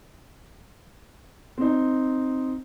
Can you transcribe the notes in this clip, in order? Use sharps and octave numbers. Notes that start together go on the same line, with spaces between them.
C4 D#4